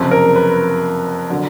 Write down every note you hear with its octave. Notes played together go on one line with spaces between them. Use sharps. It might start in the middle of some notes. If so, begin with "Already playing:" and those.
Already playing: F#1 F2 C3
A#4
B4
D3 F#3